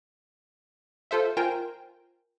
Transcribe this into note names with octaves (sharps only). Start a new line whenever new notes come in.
F4 A4 C5 E5
F4 A#4 C5 G5 G#5